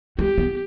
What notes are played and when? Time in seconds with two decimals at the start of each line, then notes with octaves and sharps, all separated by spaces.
0.19 G#3 G4
0.38 B3